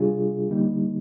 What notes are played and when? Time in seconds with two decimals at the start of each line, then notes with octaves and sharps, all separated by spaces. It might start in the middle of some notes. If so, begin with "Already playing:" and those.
Already playing: C3 G3 D4 F4 G#4
0.50 D3 G3 A#3 D#4